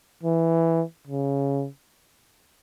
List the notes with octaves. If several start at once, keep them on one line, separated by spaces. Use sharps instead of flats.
E3
C#3